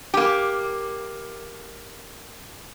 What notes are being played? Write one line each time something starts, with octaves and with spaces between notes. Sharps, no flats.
A#3 G4